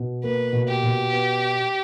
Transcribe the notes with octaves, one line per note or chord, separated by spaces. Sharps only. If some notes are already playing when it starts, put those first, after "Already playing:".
Already playing: B2
A#3 B4
B2
G4
B2
B3